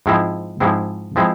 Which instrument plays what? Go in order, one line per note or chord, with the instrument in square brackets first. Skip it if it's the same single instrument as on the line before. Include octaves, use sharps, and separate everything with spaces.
[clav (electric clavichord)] G#2 F3 G#3 C4 E4
G#2 F3 G#3 C4 E4
F3 G#3 C4 E4